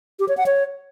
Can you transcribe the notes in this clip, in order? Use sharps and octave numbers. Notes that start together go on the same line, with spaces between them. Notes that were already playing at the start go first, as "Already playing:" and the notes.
G4
C#5
F#5
C#5